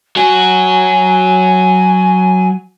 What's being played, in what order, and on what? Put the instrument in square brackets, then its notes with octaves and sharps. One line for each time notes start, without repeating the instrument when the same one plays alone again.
[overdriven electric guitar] F#3 F#4 [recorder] G#5